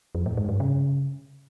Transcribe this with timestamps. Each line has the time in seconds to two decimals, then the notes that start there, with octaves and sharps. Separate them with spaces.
0.15 F2
0.26 A2
0.37 G#2
0.49 G2
0.60 C#3